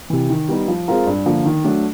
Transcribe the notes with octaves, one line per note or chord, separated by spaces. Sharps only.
C3 E3
D#3
G3 B3 D#4
F3
G#3 C4 F4 A#4
G2
D3 F3 A#3
D#3
F#3 A3 D4